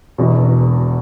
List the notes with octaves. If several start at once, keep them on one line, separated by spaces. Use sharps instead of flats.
E1 E2 B2